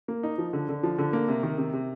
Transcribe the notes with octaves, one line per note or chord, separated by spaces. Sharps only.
A#3
D#4
F3
D3
D3
F3
D3
A#3
C3
D#3
C3
C3